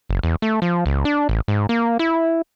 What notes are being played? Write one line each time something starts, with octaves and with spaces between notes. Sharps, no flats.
F#1
E2
A3
F3
C#2
D4
A1
G#2
A#3
E4